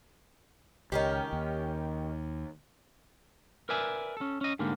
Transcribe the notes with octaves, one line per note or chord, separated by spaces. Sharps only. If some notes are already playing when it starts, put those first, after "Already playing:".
C#2 D#3 C#4 G4
D#2
A#4 B4 D5 E5 G#5
C#4 A4
C#4 D#5
G#2 D3 G3 A#3